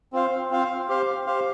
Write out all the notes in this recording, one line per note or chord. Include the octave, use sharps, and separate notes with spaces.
C4 F4 C5 F5
C4 F4 C5 F5
G4 C5 F5
G4 C5 F5